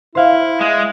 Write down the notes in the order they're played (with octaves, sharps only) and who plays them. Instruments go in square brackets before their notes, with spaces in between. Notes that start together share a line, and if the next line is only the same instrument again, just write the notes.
[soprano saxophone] E4 [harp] C5 F5
[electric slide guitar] G#3